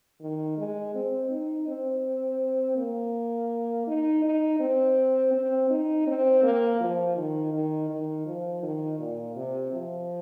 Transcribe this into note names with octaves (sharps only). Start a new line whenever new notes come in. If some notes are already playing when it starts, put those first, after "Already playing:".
D#3
G#3
C4
D#4
C4
A#3
D#4
D#4
C4
C4
D#4
C4
A#3
F3
D#3
D#3
D#3
F3
D#3
A#2
C3
F3